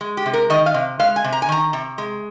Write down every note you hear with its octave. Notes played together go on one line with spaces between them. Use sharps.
G#3
G4
C3
A#4
D#3 D#5
F5
C3
G#3 F5
G#5
C3
A#5
G#5
D#3 A#5
C3
G#3